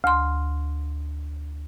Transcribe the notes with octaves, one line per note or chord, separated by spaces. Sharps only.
D2 C6